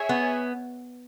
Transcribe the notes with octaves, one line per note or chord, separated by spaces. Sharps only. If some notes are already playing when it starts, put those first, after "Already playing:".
Already playing: G#4 C#5 E5 G#5
B3